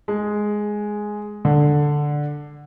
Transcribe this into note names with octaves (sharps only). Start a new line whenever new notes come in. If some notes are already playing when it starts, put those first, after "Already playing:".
G#3
D3